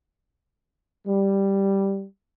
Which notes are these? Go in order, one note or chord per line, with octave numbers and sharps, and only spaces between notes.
G3